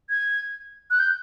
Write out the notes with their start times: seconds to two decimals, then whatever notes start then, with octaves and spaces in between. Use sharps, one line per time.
0.09 G#6
0.91 F#6
0.99 G6